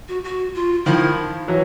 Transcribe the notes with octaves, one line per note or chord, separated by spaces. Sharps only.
F#4
F#4
F4
D#3 F3 E4
E3 F#3